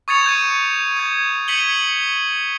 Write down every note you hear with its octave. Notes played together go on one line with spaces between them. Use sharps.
C#6 D#6 G#6 A6 C#7 F7
G6 D#7
D#6 G#6
G#6 B6 C#7 D#7 F#7 G7